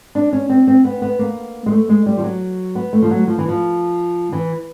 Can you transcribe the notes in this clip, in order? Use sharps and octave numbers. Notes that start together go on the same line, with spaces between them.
D4
C#4
C4
C4
B3
B3
A#3
G#3
A3
G#3
G3
F3
F#3
B3
A3
F3
F#3
F3
E3
F3
E3